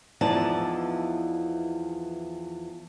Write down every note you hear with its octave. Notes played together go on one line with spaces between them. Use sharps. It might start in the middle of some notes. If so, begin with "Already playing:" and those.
E2 E3 F3 D#4 D5 A5